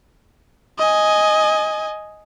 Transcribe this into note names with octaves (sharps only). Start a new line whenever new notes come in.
D#5 G#5